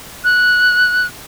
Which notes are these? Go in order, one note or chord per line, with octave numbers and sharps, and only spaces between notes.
F#6